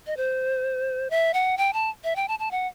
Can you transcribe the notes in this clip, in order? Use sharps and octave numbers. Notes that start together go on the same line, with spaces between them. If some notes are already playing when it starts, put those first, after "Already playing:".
D#5
C5
E5
F#5
G5
A5
E5
G5
A5
A5
F#5